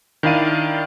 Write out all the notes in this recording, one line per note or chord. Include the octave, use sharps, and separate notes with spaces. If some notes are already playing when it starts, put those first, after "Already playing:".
D#3 D4 E4 D5 F5 D#7